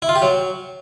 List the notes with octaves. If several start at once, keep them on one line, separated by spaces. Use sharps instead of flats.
E4
F4
G4
F#3